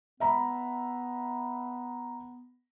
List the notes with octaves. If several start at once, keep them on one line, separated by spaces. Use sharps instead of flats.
B3 E5 A#5 B5